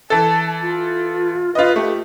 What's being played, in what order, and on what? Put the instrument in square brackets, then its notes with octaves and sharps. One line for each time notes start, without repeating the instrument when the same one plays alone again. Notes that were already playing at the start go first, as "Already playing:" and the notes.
[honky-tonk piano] E3 A4 [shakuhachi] A5
[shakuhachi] F4
[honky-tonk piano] F4 D#5 [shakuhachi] B4
[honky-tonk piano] A3 [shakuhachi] G4